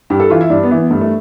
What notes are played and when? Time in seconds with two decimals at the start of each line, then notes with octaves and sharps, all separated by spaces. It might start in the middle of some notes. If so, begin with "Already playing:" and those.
0.10 G2 G4
0.20 A4
0.30 E3 F4
0.41 E4
0.50 G2 D4
0.63 B3
0.71 E3
0.77 B3
0.90 G2 A3
1.01 A3